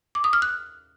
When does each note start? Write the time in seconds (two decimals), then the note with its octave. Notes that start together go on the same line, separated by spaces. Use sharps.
0.15 D6
0.24 D#6
0.33 F6
0.42 F#6